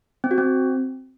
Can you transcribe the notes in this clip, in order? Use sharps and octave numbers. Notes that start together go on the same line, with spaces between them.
C4
F#4
C4